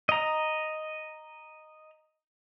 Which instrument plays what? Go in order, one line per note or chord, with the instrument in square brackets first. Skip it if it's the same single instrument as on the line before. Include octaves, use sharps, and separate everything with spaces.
[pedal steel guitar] D#5 A#5